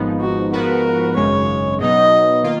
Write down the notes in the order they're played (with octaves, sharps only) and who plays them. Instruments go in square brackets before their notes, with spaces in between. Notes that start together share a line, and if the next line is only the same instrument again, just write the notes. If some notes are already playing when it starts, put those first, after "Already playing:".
Already playing: [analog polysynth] G#1 G#2 F3 B3 D#4
[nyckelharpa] F#4
[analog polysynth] G#2 F3 B3 F#4 B4 [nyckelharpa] A#4
[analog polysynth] G#1 F#2 C#3 G#3 [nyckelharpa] C#5
[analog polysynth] B2 F#3 B3 D#4 [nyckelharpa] D#5
[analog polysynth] D#3 A#3 F4